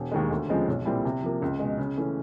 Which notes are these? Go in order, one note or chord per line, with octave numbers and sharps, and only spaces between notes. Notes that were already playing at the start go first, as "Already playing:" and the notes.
Already playing: E1
D#2 D#3 G#3
D2
C#3 F3 G#3 C4
B1
A#2 G3 C4 E4
C3
F3 A#3
C#2
B2 G#3
C#3
E3 A3 C#4